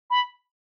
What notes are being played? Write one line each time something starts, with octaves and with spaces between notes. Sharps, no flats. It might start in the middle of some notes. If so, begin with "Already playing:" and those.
B5